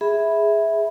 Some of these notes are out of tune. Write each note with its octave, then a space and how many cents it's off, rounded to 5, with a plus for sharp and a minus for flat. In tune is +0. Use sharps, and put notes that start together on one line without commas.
G#4 +0 E5 -10 B5 +0